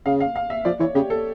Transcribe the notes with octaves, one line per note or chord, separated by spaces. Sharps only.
C#3 F5
F5
F5
E5
F3 D5
E3 C#5
C#3 G4
A4